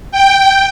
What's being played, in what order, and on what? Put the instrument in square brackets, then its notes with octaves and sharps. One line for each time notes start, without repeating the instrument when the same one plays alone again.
[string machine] G5